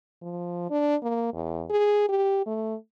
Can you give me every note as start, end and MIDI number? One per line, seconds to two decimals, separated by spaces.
0.22 0.70 53
0.70 0.96 62
1.02 1.30 58
1.33 1.64 40
1.70 2.06 68
2.09 2.44 67
2.46 2.74 57